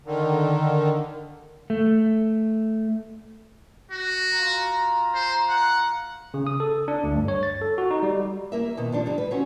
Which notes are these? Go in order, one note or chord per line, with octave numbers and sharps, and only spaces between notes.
D3 D#3
A3
F#4
F4 A#5
C5
F#5
C#3
D#6
A4
D4
D2
G2
C#5
A6
A4
F#4
D#4
G3
A#3 A#4 E5
B2 D#3
F3 G3 D4
D2 G3
B4
C4 C#4 F#4